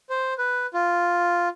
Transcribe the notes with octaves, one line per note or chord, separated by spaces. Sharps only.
C5
B4
F4